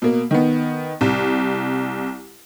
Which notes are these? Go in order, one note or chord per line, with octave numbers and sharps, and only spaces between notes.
B2 A#3
D#3 B3
C2